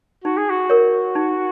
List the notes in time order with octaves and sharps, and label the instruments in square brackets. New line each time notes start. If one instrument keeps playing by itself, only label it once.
[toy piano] D#4 [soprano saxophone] F#4
[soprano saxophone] G#4
F#4
[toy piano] A#4 C#5
D#4